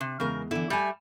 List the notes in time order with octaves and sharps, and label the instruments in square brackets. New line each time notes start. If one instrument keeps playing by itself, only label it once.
[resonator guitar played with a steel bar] C3
[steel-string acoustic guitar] E2 G#3 [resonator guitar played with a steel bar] C#3 A#4
[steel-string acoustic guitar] D3 E3 [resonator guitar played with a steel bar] E4
[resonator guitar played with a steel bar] G3 A3 [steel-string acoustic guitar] E5 G#5